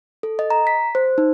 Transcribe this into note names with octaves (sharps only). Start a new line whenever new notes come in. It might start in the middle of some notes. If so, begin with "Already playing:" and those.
A4
D#5
A#5
B6
C5
D#4